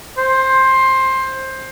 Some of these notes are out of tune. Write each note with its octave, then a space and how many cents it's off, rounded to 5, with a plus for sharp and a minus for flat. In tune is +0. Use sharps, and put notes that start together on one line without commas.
C5 +15